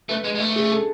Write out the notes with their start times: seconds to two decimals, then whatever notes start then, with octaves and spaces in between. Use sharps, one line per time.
0.09 A3 B4
0.24 G#3
0.35 G#3
0.40 A3
0.56 G#4
0.71 A4